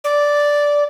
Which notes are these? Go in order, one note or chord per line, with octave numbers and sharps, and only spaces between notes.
D5